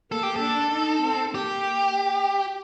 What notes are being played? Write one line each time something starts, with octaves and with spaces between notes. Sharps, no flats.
A#3 A4
G4
A4
D4
D#4
C4
A#3 G4